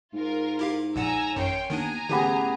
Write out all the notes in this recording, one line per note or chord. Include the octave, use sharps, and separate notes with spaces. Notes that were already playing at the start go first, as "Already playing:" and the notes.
G#2 F4 A#4
E4 G4 F5
A#1 A#2 F#5 G#5 A#5 E6
A1 F#2 C#5 G5 C6
D#2 D#3 B3 D4 G#5 A#5
A1 D3 E3 B3 G4 G#4